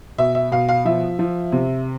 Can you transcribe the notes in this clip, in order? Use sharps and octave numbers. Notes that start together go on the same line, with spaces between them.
B2 E5
E5
B2 F5
F5
F3 E5
F3
C3